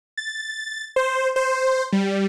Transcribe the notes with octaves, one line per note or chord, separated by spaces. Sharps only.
A6
C5
C5
G3